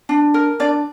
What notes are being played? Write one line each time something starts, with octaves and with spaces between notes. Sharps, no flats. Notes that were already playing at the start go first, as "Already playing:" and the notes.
D4
A#4
D4 D5